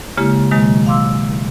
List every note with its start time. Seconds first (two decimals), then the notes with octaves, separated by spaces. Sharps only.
0.17 C#3 G#3 A#3 E4 G4 F6
0.51 B2 D#3 F#3 G#3 A#3
0.86 F5 C6 D6 E6